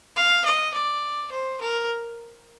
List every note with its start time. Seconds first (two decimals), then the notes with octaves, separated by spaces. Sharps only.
0.16 F5
0.45 D#5
0.74 D5
1.31 C5
1.61 A#4